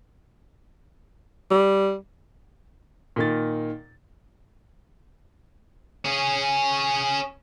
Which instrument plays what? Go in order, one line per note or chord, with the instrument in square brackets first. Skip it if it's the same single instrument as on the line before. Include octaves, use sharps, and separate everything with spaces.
[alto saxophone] G3
[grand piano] A#2 D#3 A6
[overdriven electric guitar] C#4 G#4